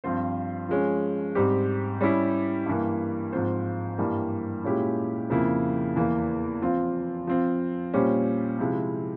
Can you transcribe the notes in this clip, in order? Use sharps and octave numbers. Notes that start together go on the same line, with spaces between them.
G2 F3 C4 F4 C5
F3 G#3 C#4
G#2 G3 C4 G4
G3 C#4 E4 G4
G2 E3 A#3
G#2 F3 C4 F4 C5
G2 E3 G3 A#3
A#2 G#3 C#4 E4 G4
F2 C#3 F3 A#3 E4
E2 E3 A#3
F3 C4 F4
F3 C4 F4
A#2 G3 C#4 G4 C5
C3 F3 G#3 E4